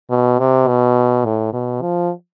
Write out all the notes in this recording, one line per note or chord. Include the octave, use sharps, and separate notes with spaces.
B2
C3
B2
A2
B2
F3